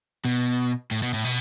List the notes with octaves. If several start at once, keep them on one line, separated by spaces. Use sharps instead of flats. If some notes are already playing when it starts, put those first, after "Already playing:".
B2
A2
B2
A2
B2